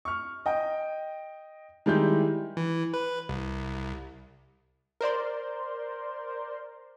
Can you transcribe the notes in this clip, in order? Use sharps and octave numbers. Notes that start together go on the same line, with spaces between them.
C#6 F6
D#5 G5
D#3 G3 G#3 E4 G4 G6
E3
B4
C2
A#4 C5 D5 C6